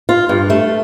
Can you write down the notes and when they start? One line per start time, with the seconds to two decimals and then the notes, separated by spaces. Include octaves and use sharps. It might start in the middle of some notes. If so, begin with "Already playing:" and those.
0.09 F4
0.29 G2
0.50 A3